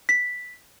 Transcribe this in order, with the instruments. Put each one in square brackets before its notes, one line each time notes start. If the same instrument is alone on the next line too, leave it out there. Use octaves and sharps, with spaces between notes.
[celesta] B6